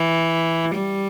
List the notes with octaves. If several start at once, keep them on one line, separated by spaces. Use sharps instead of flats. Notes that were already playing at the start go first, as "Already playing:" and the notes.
Already playing: E3
G3